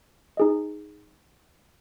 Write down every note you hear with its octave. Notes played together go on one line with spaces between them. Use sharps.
D#4 G#4 D#5